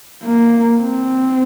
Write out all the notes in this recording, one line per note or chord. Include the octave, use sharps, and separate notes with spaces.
A#3
C4